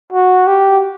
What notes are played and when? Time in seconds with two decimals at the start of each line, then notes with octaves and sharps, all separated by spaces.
0.12 F#4
0.47 G4